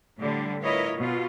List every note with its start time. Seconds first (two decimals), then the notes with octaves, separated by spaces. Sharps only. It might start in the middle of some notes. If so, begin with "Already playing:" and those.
0.18 A2 D3 G3
0.63 E4 F4 A#4 B4 C#5 D#5
0.96 B2 F4